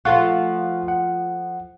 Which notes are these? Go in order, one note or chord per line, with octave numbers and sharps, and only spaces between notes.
F3 A3 F4 F#5 C#6 F#6
F#5